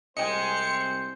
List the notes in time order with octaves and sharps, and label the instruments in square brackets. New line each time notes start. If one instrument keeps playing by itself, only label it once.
[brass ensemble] C2 C4 C5 [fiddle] G#3 [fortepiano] D#5 G5 [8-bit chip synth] C#7